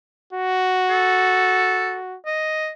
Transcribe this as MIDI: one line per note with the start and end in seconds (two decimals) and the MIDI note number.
0.33 2.17 66
0.90 1.96 69
2.26 2.70 75